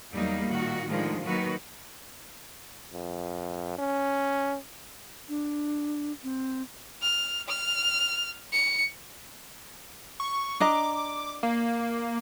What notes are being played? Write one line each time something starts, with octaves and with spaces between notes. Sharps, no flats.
E2 F#3 G3 A#3 D#4
A#2 D#3 F#4
A2 D3 D#3 F3 G#3
D#3 F#3 A#3 F#4 A#4 B4
F2
C#4
D4
C4
F6
F6
C#7
C#6
D4 D#5 A#5 D6
A#3